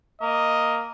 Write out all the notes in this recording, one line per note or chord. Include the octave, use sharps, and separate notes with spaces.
A#3 D#5